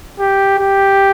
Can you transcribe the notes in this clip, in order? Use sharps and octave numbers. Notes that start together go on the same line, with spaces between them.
G4
G4